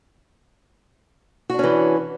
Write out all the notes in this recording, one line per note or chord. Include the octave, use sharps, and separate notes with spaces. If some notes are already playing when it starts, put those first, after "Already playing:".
E3 C#4 D4 F#4